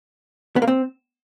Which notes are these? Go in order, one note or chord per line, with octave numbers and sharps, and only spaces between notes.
B3
A#3
C4